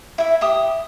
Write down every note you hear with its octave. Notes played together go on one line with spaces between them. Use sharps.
E4 E5
G4 E5 D#6